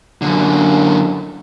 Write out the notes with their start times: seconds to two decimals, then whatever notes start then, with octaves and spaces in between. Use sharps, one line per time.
0.22 F#2 D3